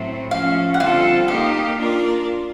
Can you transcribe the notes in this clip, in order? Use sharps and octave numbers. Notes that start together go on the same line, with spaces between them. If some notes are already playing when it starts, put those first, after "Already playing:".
Already playing: A2 F#3 A3 C4
F3 A3 C#4 F5
F#5
D3 G3 C4 F4 A4 F5
A#3 D#4 G4 F5
A#3 D4 F4 A#4 D5